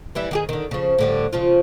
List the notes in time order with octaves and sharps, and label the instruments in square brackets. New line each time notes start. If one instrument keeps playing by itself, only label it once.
[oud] E3 G3 E4
D#3 G4 G#4
D3 D#3
C#3 F3
A2 D3 G3
C#3 F3 F4